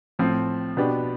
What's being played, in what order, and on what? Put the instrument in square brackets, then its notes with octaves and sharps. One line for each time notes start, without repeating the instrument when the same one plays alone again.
[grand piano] A2 F3 C4
B2 B3 D4 G4